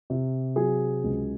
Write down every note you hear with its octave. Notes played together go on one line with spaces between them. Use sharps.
C3
F#3 G#4
C#2